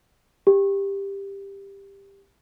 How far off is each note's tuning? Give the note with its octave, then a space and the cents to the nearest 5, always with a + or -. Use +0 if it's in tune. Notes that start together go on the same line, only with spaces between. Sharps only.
G4 +15